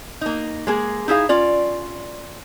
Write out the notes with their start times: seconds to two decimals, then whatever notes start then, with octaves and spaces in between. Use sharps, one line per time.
0.21 A#3 D#4
0.67 G#3 A#3 G#4
1.08 D#4 E4 G#4 F5
1.29 C#4 F4 D5